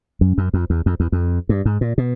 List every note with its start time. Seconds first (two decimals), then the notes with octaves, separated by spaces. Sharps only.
0.21 F#2
0.38 F#2
0.54 F2
0.70 E2
0.86 F2
1.00 E2
1.12 F2
1.49 G2
1.65 G#2
1.81 A#2
1.98 B2